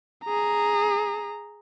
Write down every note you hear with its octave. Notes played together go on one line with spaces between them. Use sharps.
G#4 A#5